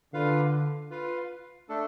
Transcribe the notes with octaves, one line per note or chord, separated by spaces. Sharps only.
D3 F4 B4 F5
F4 B4 F5
A3 D4 A4